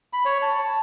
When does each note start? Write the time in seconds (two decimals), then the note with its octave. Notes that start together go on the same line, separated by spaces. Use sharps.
0.13 B5
0.25 C#5
0.42 A5